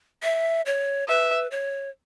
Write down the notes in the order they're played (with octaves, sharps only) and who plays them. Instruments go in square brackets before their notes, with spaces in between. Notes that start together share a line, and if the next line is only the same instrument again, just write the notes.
[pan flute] E5
C#5
[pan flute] B4 [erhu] E5
[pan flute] C#5